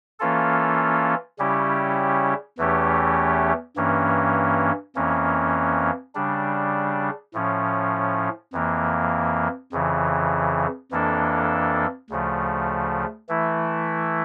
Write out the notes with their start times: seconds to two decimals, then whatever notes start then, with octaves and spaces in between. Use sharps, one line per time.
0.19 E3 A#3 C#4 F4 A4
1.39 C#3 G3 C#4 E4 G4
2.58 E2 E3 A3 C#4 G4
3.76 G2 E3 A#3 C#4
4.96 F2 E3 A#3 C#4
6.15 C#3 G3 D4
7.34 A2 F3 C#4
8.53 F2 E3 A#3
9.72 F2 C#3 E3
10.91 F2 E3 A#3 D4 A4
12.10 D2 C#3 F3 A3
13.29 E3 A3 E4